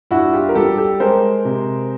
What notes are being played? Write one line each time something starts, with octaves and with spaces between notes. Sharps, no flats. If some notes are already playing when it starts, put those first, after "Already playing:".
G2 E4 F#4
F4 G4
A#4
G3 G4 A4
G4 A4
G#3 A#4 C5
C3